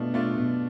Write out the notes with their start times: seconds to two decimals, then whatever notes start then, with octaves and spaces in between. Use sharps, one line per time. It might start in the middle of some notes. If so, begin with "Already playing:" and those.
Already playing: B2 A3 D4 F4
0.14 A3 D4 F4
0.37 B2